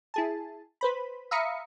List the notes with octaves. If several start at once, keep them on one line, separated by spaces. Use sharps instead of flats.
E4 G#4 A5
B4 C5 B5
E5 F5 A#5 B5 D#6 C#7